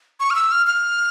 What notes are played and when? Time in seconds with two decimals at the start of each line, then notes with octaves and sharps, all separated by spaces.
0.20 C#6
0.30 F6
0.35 E6
0.52 F6
0.67 F6